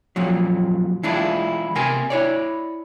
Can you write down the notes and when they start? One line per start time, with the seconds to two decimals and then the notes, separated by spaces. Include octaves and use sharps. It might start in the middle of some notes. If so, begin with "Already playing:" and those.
0.16 F2 A#2 F3 F#3
1.03 E3 G#3 D4 E4 F4
1.75 C3 A#4 G#5 C6
2.10 E4 C#5 D5